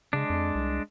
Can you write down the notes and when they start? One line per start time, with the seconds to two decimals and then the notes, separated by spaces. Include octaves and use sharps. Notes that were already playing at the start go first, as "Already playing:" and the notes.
0.13 C#3 G#3 D4
0.30 F2
0.55 C2